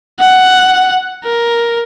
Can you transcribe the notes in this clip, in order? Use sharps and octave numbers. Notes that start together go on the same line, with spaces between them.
F#5
A#4